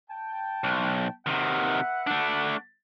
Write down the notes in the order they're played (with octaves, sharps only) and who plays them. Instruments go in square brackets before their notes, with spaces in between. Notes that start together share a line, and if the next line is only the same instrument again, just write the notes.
[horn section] G5 A5
[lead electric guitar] B1
[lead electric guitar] C3 D#3 [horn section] B4 E5 F#5
[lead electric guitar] A3 D4